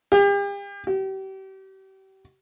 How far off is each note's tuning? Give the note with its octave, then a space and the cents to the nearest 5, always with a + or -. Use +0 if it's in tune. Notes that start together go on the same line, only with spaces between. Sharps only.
G4 +40
G4 -35